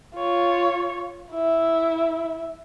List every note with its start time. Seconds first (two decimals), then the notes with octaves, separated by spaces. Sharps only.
0.16 F4 C#5
1.31 E4 E5